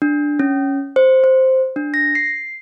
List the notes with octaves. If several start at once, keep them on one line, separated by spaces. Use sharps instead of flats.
D4
C#4
C5
C5
D4
A#6
C7